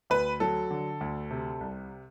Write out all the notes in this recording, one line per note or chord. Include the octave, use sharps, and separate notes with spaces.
D2 B4
F#3 A4
D3
D2
C3
C2